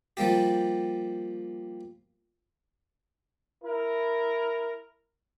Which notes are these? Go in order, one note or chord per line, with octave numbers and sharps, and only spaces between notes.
F3 G3 A#3 G4
E4 A#4